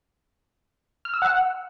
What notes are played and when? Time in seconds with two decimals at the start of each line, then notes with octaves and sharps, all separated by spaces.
1.05 F6
1.14 E6
1.22 F#5